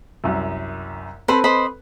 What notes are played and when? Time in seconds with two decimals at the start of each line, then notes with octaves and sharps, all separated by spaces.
0.24 C2 F#2
1.28 C4 A4 B4 C5 B5
1.44 C5 D#5 B5